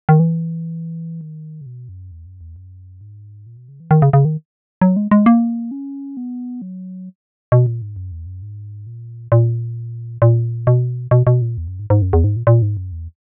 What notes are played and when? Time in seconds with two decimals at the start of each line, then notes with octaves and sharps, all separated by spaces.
0.09 D#3
0.20 E3
1.21 D#3
1.61 C#3
1.66 B2
1.89 F#2
2.11 E2
2.26 F#2
2.41 E2
2.56 F#2
3.01 G#2
3.46 A#2
3.57 B2
3.68 C#3
3.80 E3
3.91 D#3
4.02 C#3
4.13 C#3
4.25 D#3
4.81 F#3
4.96 G#3
5.11 G#3
5.26 A#3
5.71 C#4
6.17 B3
6.62 F#3
7.52 B2
7.66 A#2
7.82 G#2
7.96 F#2
8.12 E2
8.26 F#2
8.42 G#2
8.87 A#2
9.32 A#2
10.22 A#2
10.67 B2
11.11 B2
11.27 B2
11.42 A#2
11.58 E2
11.68 F#2
11.79 G#2
11.90 G#2
12.02 F#2
12.13 E2
12.24 G#2
12.36 A#2
12.47 A#2
12.62 G#2
12.77 F#2
12.92 E2